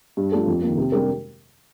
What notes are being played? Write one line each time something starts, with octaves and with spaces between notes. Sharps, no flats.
G2
F3 A3 D4 A4
F2
A#3
D#3
C3
G3 D4 G4 A#4